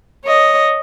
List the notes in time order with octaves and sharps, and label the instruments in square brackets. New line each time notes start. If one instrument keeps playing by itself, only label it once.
[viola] C#5 D#5